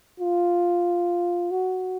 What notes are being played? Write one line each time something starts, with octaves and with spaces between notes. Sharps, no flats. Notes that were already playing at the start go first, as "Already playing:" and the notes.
F4
F#4